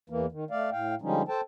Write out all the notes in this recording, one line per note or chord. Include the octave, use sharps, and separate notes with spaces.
E2 E3 A#3
D#3
A3 D5 F5
A2 F5 G5
D3 F3 G3 G#3 C#4 D#4
A4 C5 G5 A5